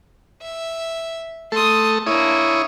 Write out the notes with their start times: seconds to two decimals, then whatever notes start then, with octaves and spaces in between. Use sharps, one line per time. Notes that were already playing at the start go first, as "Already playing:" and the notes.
0.42 E5
1.52 A3 A4 C6 D#6
2.06 A#3 D4 E4 C#5 D#6